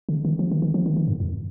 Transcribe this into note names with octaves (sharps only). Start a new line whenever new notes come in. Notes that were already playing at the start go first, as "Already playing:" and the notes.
D3
D#3
F3
D#3
D#3
F3
D#3
D#3
G2
F2